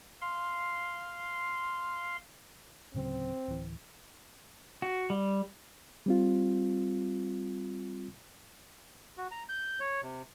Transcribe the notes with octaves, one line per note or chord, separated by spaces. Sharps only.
F5 C6
D1 C#3 F#3 C4
D1 E3
F#4
G3
G3 C4 F4
F#4
A#5
G6
C#5
C3